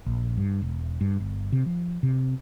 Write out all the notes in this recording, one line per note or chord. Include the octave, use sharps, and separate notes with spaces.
A#1
G2
E1
G2
G1
C3
F3
C3